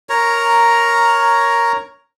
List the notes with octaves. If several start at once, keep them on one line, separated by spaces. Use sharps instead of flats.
A#4 C#5 A#5